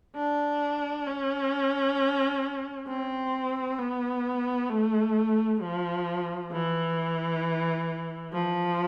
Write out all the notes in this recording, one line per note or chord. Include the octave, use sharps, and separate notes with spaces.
D4
C#4
C4
B3
A3
F3
E3
F3